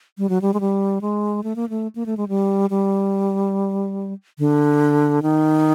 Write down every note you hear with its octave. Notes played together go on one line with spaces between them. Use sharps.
G3
F#3
G3
G#3
G3
G#3
A3
A#3
A3
A#3
A3
G#3
G3
G3
D3
D#3